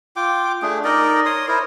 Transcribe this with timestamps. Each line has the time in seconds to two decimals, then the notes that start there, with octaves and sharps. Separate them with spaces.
0.16 F4 G5 D6
0.62 A3 D4 G#4
0.84 D#4 A#4 D5 D#5
1.26 C#5 C6 D#6
1.48 E4 A#4 C5 C#5